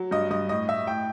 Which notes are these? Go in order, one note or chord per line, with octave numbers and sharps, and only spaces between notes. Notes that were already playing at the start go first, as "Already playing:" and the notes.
Already playing: F#3
G2 D#5
G2 D#5
A2 D#5
A2 E5
A2 G5